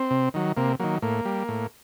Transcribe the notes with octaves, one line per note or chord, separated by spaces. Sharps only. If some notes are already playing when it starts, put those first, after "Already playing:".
Already playing: C4
C3
D#3 F#3
C3 A#3
D#3 F#3 A#3
A2 A#3
G3
A2